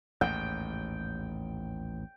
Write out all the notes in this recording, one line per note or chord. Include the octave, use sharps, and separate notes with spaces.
A1 D#2 G#2 G5